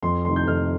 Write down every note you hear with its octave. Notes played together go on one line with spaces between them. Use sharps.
F2 C6
C3 D#3 A3 C6
G6
F2 F6